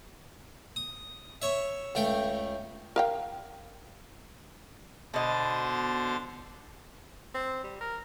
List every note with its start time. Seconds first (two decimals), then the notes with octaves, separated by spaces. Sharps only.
0.76 D#6
1.42 C#5 E5
1.95 C#2 A3 G5
2.96 A#4 F5 G5
5.14 B2 D3 C5 D#5 A6
7.34 C4
7.64 G3
7.81 A#4